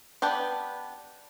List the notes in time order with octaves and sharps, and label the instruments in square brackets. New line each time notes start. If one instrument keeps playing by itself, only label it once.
[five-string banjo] B3 D4 G4 B4